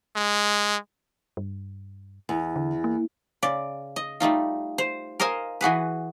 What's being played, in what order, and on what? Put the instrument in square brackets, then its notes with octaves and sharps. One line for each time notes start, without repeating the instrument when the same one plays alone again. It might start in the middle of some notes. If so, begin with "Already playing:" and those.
[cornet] G#3
[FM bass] G2
[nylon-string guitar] E2
[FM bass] D3
A#3
[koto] C#3 D5
D#5
G3 A3 D#4 F4
C5
A#4 C5 D#5 F5 G#5
E3 F#4 G#4 B4